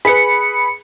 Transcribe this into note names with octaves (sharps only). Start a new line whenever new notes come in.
G#4 B4 B5 C#7